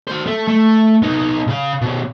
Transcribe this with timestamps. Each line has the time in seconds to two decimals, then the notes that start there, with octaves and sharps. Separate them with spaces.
0.07 F#4 C5
0.26 A3
0.48 A3
1.02 B3 D#4
1.47 C#3 F5
1.81 B2 C#4